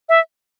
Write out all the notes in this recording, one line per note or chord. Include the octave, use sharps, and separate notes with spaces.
E5